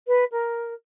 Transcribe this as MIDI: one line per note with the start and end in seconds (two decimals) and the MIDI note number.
0.07 0.24 71
0.32 0.74 70